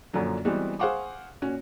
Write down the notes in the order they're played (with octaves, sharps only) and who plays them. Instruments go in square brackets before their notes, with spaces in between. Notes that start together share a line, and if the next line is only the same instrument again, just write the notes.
[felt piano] F#2 A#2 D3 F3 F#3 D4
E3 G3 G#3 B3 C4 F#4
G#4 C5 F5 F#5 C#6 D6
A#2 C#4 F#4